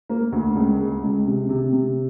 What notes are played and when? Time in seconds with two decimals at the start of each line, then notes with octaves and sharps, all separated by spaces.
0.10 A#3
0.32 D2
0.55 C#2
0.79 G#3
1.03 C#2
1.27 C3
1.49 C3
1.73 C3